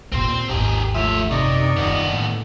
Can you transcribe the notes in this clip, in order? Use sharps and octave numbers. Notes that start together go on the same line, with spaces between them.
D#2 A#2 C4 C5
G#1 D#2 D#4 G4 G#4
F3 A3 C#5 E5
F#2 C3 D#4 D5 D#5 C#6
D#1 D#2 B3 F4
F#2 A2 D3